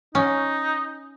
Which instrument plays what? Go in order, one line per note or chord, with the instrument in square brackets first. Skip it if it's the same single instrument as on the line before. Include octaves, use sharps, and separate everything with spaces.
[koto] C#4 [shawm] D#4